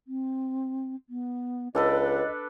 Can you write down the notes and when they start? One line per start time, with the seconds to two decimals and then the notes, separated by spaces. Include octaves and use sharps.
0.07 C4
1.09 B3
1.75 C#2 D4 A4 B4 D#5